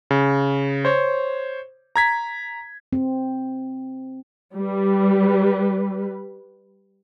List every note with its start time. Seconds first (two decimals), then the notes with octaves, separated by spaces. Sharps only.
0.11 C#3
0.85 C5 C#5
1.96 A#5 G#6 B6
2.93 C4
4.56 G3 B4